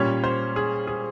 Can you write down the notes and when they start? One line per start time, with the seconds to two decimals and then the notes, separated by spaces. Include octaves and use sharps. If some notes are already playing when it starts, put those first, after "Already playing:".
Already playing: A#2 G3 C#4 C#5
0.24 C5
0.56 G#4
0.87 G#4